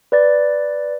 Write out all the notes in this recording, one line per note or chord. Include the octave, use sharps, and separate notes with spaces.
B4 D5 A6